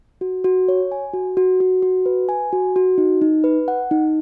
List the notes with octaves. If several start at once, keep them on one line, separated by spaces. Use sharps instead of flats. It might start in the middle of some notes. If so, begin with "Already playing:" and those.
F#4
F#4
C#5
G#5
F#4
F#4
F#4
F#4
B4
G#5
F#4
F#4
D#4
D#4
B4
F#5
D#4